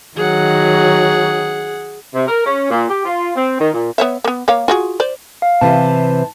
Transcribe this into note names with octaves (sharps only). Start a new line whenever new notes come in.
D#3 F#3 G#4 F#5
C3
A#4
C#4
A#2
G4
F4
C4
D#3
A#2
B3 C#5 E5
A#3 B3
A#3 C#5 F5
F4 F#4 G#4
C5 D5
F5
C3 E3 A5